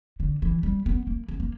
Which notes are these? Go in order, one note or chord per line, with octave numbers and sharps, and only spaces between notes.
D3
E3
G3
B3
A#3
B3
A#3